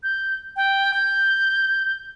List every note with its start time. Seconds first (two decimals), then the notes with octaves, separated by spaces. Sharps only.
0.03 G6
0.56 G5
0.94 G6